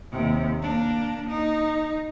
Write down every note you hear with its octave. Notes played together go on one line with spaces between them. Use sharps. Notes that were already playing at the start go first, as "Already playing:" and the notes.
D#2 C3
A#3 D4
D#4